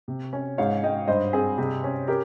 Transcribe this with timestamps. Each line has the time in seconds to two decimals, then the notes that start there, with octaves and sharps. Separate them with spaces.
0.08 C3
0.33 C#4
0.58 G#2 C#5 F5
0.83 G#2 D#5 G5
1.08 G2 C5 D#5
1.33 C4 G#4
1.58 C3 G#4
1.84 C#4
2.08 G4 A#4